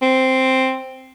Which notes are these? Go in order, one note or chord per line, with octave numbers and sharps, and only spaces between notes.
C4